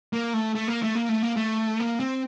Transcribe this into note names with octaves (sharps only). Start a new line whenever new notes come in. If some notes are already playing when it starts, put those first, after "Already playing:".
A#3
A3
A3
A#3
A3
A#3
A3
A#3
A3
A#3
C4